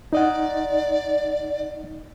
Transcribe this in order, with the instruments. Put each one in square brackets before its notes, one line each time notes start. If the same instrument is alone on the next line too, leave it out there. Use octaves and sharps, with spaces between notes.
[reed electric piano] D#4 D#5 F#5 [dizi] D5